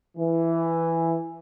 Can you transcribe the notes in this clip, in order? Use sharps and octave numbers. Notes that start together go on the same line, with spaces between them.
E3